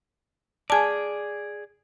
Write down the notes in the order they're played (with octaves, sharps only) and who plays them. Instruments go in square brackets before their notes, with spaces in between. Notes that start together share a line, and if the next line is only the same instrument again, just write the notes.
[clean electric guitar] G#4 D5 [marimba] G#5 A5